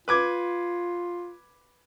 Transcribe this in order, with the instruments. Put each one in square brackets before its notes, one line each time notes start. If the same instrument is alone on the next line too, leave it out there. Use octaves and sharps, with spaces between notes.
[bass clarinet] F4 [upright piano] B4 D6 G#6